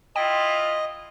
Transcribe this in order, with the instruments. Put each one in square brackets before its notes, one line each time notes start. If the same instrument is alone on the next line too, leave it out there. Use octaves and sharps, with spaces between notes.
[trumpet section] E4 F4 [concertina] D#5 [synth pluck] G5